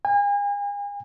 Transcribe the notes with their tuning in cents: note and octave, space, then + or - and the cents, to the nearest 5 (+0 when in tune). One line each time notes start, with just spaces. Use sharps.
G#5 -40